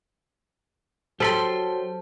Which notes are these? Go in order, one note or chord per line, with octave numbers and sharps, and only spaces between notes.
F#3 G4 A4 C5 A5 B5 C6